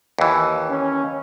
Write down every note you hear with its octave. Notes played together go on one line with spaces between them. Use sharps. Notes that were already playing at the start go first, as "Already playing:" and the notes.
D#2 E3
C#4